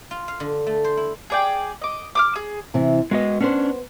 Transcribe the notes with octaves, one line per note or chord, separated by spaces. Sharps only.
F4
F5
D3
A3
C5
E4
G#4 D5 G5
D#5 D6
D6 D#6 F6
G#4
C3 E3
G#3 B3 F#4 D#5
B3 C#4 D4 C5